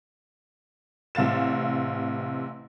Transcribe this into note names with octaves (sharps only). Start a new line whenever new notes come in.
A1 C3 F5 A6 E7